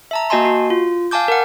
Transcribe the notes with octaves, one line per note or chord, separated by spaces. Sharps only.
E5 A5 A#5
A#3 F#4 D#5 G#5 A5 C6
F#4
F4
F5 G#5 A5 D6 G6
A#4 F#5